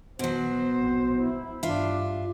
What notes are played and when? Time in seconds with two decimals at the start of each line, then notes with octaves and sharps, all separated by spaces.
0.19 B2 F#3 C5
0.80 A#1 C4
1.15 E4
1.63 G2 D4 F4 E5